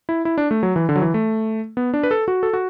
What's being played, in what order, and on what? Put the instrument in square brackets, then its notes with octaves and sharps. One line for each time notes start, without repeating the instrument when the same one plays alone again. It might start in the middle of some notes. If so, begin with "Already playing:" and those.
[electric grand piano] E4
E4
D4
A3
F#3
E3
D3
F#3
E3
A3
B3
D4
B4
A4
F#4
A4
F#4